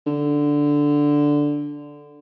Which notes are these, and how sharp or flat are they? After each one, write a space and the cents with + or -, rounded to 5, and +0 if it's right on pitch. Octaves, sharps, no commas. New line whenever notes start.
D3 -5